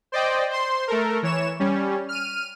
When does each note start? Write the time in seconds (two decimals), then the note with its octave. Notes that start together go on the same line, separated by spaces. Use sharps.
0.12 C5 D5 D#5 G5
0.50 C5 C6
0.88 A3 A4 A#4
1.23 E3 C#5 E7
1.60 G3 C#4
2.09 F6 D#7